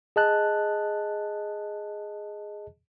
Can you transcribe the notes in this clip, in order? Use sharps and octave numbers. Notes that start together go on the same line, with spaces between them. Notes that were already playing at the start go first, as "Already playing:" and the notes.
G#4 D#5 A5 F#6